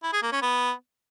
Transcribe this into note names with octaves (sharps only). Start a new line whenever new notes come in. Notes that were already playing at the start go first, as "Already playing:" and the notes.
E4
G#4
A#3
C#4
B3